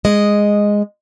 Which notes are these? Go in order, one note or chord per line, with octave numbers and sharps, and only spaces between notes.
G#3 D#5